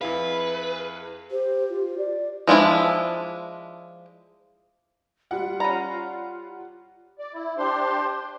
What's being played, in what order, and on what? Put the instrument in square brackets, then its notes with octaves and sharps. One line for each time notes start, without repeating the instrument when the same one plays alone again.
[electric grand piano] F2 E4 F5 [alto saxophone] G#4 [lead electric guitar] B4
[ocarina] G4 [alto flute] C5
[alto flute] F4
D5
[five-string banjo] F3 G#3 D4 E4
[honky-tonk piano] G3 F#5 [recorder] F4
[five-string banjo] C#4 A#5 [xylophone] D5 B5
[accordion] D5
E4
D4 G4 C5 C6